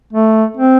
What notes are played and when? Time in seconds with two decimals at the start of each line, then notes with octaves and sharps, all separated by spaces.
0.13 A3
0.57 C4